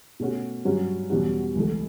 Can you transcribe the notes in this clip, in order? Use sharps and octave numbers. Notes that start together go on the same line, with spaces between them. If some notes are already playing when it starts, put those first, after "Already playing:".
B2 A3 C#4 F#4
G2 F#3 C#4 F#4
E2 B2 G3 C#4 F#4
C#2 C#3 E3 A3